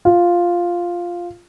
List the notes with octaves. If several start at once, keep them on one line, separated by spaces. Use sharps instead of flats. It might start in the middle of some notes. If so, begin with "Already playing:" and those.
F4